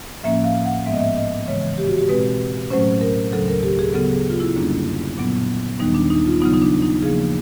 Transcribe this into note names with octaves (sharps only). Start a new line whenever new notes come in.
A2 F3 A#3 C#4 E5
F5
F#5
G#2 F3 G#3 B3 E5
D#5
E5
D#5
C#3 E3 G#3 C#5
G4
F#4
G4
B2 G#3 C4 B4
A2 F#3 A3 C#4 C5
A#4
D2 C#3 F#3 A4
A#4
G4
G#4
C#3 F#3 B3 A4
G#4
F4
E4
F#2 D3 G3 A#3 C#4 D4
A#2 F#3 B3
D#2 D#3 G3 B3 D#4
D4
D#4
F4
C#3 F#3 B3 D#4
D#4
D4
D#4
C#3 F3 A#3 G#4